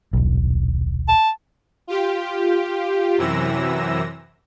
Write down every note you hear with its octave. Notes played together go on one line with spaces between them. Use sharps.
D#1 B1
A5
F4 G4
F#2 C3 E3 E6 A#6